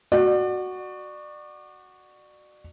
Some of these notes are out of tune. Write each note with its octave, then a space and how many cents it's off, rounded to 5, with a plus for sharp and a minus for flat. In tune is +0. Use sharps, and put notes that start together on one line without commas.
F#4 +0 D5 +30